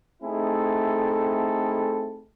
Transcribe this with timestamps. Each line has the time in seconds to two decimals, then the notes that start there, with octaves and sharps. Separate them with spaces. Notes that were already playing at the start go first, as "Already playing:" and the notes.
0.23 A3 C4 D#4 E4 G#4 A4